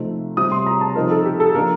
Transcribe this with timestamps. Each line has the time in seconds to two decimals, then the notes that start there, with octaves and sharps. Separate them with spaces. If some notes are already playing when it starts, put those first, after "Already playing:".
Already playing: C3 F3 A3 C4 D#4
0.37 C3 G3 C4 D#6
0.52 C6
0.66 A#5
0.81 A5
0.96 F3 C4 D#4 A#4
1.11 A4
1.25 G4
1.40 A4
1.55 F3 A#3 D4 A#4